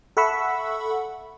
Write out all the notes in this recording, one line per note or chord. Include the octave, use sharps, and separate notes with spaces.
A4 E5 F#5 B5 C#6 E6